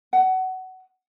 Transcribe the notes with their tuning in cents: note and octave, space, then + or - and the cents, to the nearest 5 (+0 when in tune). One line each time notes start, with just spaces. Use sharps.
F#5 +20